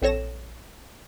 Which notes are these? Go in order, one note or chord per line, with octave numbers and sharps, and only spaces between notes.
A#1 C4 A4 C#5 A#6 E7